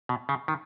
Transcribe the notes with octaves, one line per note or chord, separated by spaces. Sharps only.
B2
C#3
D#3